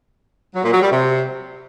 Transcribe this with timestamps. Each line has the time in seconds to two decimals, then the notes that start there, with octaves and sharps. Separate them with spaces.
0.55 F#3
0.64 A#2
0.73 F#3
0.82 G3
0.91 C3